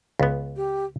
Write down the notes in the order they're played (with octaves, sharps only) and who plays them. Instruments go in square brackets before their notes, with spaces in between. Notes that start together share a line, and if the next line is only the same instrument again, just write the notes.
[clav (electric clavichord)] C#2 B3
[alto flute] G4